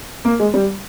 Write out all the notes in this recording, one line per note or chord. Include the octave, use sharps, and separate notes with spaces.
A#3
G#3
G3